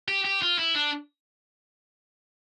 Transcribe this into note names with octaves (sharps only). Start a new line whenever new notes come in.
G4
G4
F4
E4
D4